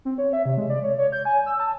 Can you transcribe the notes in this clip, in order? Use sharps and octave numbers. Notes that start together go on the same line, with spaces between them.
C4
C#5
E5
C3
G#3
D5
C#5
C#5
G6
G#5
E6
A5